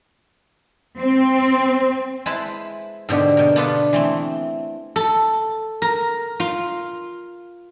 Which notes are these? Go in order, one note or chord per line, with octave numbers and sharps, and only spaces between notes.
C4
G#3 E4 B4 C5 A5 B5
G#2 B2 D3 G4
B2 A#4
B3 D4 F4 A4 B4
E3 A3 C4
A4
A#4
F4